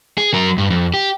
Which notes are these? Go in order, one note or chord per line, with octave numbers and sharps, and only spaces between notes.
G#4
F#3 A#4
G2
F2
G4